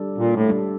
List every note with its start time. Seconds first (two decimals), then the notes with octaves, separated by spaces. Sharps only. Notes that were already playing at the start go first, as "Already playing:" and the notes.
Already playing: G3 D4 A4
0.18 A#2
0.34 A2
0.49 G3 D4 A4